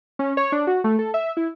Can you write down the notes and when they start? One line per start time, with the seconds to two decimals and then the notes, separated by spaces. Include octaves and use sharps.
0.19 C#4
0.37 C#5
0.52 D4
0.67 F#4
0.84 A3
0.99 A4
1.14 E5
1.37 E4